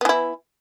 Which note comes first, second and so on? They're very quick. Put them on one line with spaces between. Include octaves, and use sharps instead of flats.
B3 E3 E4